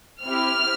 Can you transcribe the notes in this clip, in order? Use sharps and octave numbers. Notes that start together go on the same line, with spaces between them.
C4 E4 G4 F6